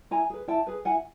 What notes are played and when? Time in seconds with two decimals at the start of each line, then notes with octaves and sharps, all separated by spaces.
0.11 E4 G#5 A#5
0.30 G#4 B4
0.48 E4 G5 A5
0.67 G#4 B4
0.85 E4 F#5 G#5